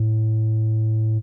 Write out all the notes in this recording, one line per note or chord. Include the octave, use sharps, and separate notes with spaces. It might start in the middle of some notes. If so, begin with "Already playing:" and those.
Already playing: A2